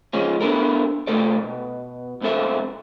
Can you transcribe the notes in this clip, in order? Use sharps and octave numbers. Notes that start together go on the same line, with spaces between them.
C#3 F3 G#3 C#4
B3 D4 E4 A4 A#4
C3 A3 A4 D5
B2
B1 G#2 C4 A4 E5